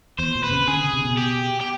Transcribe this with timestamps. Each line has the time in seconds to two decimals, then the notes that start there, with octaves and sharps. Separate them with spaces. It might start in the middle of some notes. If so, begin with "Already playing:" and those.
0.19 E2 C5
0.35 A#2
0.43 B4
0.51 C#3
0.68 D3 G#4
0.80 C#3
0.93 C3
1.05 B2
1.18 G4
1.60 G4